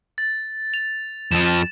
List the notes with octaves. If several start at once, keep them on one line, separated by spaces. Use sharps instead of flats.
A6
F7
F2 F3 E7